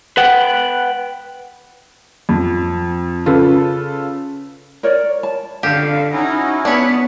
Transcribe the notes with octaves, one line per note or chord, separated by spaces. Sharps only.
B4 F#5 G5
F2
C#3 F4 A4 B4
A#4 C#5 D5
A5
F2 D3 G4 A4 F5
C#4 D#4 E4 F#4
B3 D4 C#5